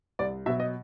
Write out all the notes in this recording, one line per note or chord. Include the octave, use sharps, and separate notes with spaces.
C2 D5
B2 F#3 E5
D#5